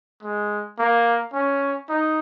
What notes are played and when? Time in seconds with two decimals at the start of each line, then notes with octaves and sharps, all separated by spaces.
0.23 G#3
0.79 A#3
1.33 C#4
1.89 D#4